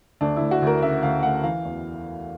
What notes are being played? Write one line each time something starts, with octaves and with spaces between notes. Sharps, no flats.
D2 D4
D2 E4
F#4
D2 A#4
C#3 E5
D2 F5
D2 F#5
E3 F5
E2